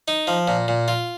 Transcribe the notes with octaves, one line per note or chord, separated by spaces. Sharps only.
D#4
F3
A#2
A#2
F4